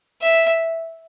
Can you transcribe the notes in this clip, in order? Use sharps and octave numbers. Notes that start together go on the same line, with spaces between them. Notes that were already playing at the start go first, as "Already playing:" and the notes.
E5